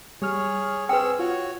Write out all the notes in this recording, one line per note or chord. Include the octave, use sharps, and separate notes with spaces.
G3 G#4 C#5 F6
C4 G#4 B4 G5 E6
F4 F#4 C#5